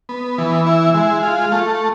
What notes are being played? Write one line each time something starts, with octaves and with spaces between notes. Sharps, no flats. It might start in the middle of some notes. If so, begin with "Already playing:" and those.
B3
E3
E4
G#3
F4
A3